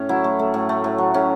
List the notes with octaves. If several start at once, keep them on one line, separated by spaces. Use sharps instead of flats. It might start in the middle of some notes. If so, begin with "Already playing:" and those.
Already playing: A2 C#4 C#5
F#3 E4
A3
A3
A2
A3
A2
F#3
A2 C#4